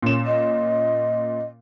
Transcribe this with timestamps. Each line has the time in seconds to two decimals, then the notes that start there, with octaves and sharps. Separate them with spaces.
0.03 A#2 C#4 E7
0.26 D#5